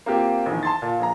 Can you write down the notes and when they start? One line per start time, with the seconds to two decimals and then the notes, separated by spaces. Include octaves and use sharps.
0.06 A#3 C4 F4 G4
0.46 A#1 E2 D#3
0.63 A5 C6 A6
0.82 A#2
0.99 A#1 A#5